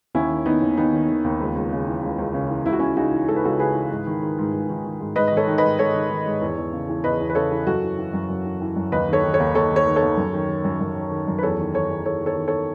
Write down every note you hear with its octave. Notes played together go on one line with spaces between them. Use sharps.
D#2 C#4 E4
D#3
D#3 B3 D#4
D#2
D#2 B3 D#4
D#3
D#3
D#2
C#2
C#2
C#3
E3
C#2
C#2
C#3
E3
C#2 E4
F#4
C#2 C#4 E4
C#3 D#4 F#4
E3
C#2 A4
B4
C#2 F#4 A4
C#3 G#4 B4
E3
G#2
D#3
D#3
G#2
G#2
D#3
D#3
G#2
G#2 B4 D#5
D#3 D#5
A4 C#5
D#3
B4 D#5
G#2
G#2 A4 C#5
D#3
D#3
G#2
E2
E2
C#3
E3
E2 B4 D#5
E2
B4
C#3 A4 C#5
E3
F#2 F#4 A4
E3
E3
F#2
F#2
E3
E3
F#2
D#2 B4 D#5
D#3 A4 C#5
D#3
A4 C#5
D#2
D#2 A4 C#5
D#3
A4 C#5
D#3
A4 C#5
D#2
F#2
D#3
D#3
F#2
F#2
D#3
D#3
F#2
B4
E2 A4 C#5
D#3
D#3 A4 C#5
E2
E2 A4 C#5
D#3
A4 C#5
D#3
A4 C#5